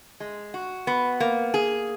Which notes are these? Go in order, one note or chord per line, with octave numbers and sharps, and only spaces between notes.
G#3
F#4
B3
A#3
G#4